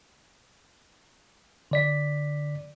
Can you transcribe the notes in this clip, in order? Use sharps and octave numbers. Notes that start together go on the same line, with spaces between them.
D3 D5 B6